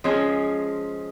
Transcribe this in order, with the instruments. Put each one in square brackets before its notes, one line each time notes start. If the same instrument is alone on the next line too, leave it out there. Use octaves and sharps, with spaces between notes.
[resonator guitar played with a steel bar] F3 G#3 C#4